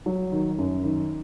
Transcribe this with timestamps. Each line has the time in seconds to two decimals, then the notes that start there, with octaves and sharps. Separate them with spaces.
0.06 F#3
0.32 D#3
0.58 F#2
0.84 D#3